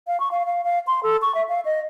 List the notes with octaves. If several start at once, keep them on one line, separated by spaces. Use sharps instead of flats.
F5
C#6
F5
F5
F5
C6
A4
C#6
E5
F5
D#5